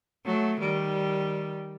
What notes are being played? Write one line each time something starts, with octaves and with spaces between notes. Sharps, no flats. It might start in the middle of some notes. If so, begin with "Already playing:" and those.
F#3 A3
D#3 G3